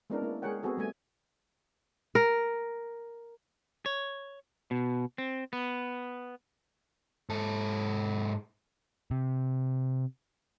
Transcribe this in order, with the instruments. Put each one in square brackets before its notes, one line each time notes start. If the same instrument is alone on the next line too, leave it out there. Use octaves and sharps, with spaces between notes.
[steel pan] G#3 B3 C#4 D4 E4 A#4
A#3 E4
G#3 G#4 A#4 C#5 F#5 G5
B3 C4 F#4 G#4 A4
G3 A3 G#5
[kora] A#4
[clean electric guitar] C#5
B2
C4
B3
[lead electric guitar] G#2 A4
[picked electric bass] C3